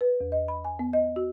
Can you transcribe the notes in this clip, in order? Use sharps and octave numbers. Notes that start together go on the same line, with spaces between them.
B4
E2
D#5
B5
G#5
B3
D#5
F#4